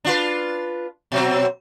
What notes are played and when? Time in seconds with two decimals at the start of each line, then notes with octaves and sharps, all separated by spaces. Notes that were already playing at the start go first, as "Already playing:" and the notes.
0.05 D4 F4 B4
1.12 B2 F#3 C4